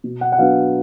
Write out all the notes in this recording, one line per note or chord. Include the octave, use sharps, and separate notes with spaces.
B2
F#5
F#5
F#3 B3 D4 F5